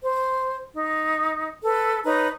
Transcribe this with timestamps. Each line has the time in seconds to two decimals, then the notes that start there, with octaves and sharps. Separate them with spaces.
0.04 C5
0.75 D#4
1.63 A4 B4
2.05 D#4 B4 C#5 A#5